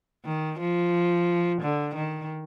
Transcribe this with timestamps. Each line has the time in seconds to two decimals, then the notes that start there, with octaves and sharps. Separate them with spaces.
0.25 D#3
0.60 F3
1.62 D3
1.96 D#3